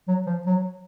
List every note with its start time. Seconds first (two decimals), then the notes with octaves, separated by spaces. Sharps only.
0.08 F#3
0.27 F3
0.46 F#3